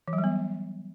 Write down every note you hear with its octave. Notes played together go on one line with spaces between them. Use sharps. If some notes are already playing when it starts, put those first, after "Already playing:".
E3
F#3
G3
B3